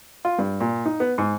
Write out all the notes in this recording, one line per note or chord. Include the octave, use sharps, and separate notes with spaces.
F4
G2
A#2
D#4
B3
G#2